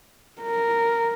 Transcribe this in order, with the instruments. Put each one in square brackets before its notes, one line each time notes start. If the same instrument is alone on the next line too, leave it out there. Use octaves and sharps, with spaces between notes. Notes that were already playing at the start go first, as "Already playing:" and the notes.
[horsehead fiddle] A#4